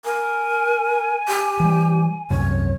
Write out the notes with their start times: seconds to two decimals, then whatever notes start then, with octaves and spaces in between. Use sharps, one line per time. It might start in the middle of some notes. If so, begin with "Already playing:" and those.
0.05 A#4 G#5
1.28 G4
1.60 E3 G3
2.30 C2 F#2 C3 C#5